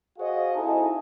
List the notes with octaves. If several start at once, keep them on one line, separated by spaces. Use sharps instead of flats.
F#4 G#4 C5 D#5 F5
C4 D#4 E4 A4 G#5 A5